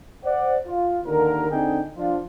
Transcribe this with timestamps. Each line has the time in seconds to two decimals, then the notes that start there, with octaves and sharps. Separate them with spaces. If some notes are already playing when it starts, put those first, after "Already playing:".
0.25 C5 D5 F#5
0.67 F4
1.04 D#2 D3 A#4
1.51 D3 C4 D4 D#4 G#4 G5
1.97 F3 D4 F4